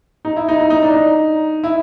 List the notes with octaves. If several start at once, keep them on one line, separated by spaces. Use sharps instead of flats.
D#4
E4
D#4
D#4
D#4
D4
D#4
E4